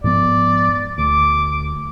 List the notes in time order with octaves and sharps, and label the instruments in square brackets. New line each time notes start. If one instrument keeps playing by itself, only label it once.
[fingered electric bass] G#2 F3 B3 [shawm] D5
[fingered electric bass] D2 [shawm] D6